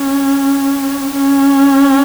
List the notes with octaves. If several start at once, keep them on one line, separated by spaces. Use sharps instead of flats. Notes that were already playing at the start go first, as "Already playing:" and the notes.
Already playing: C#4
C#4